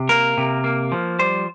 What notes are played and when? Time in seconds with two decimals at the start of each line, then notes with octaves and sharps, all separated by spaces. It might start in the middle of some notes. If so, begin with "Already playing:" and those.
Already playing: C3
0.09 A#3 A#4
0.38 C3
0.64 A#3
0.92 F3
1.19 G3 C5